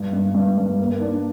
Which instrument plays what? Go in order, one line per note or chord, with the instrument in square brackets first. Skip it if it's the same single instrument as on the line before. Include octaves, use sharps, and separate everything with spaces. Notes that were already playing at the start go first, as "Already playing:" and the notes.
Already playing: [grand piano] G2
G2
G2
G2
A#3
D4